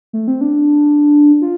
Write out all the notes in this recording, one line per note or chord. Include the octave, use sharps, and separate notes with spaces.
A3
C4
D4
F4